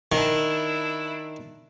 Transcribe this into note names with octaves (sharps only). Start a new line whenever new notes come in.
D#3 D4 E4